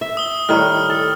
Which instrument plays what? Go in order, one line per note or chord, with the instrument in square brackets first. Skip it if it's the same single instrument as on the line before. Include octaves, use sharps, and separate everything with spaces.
[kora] E5
[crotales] D#6 G7
[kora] A2 D#3 G3 [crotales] F6
[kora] A4